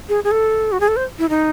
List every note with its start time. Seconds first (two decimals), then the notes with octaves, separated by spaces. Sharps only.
0.09 G#4
0.24 G#4
0.31 A4
0.72 F#4
0.80 G#4
0.88 A4
0.96 C5
1.19 E4
1.29 D#4